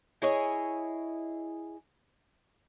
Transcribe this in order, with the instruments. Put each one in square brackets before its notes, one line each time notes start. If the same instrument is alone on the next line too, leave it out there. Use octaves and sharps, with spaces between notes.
[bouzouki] E4 G#4 C#5 D#5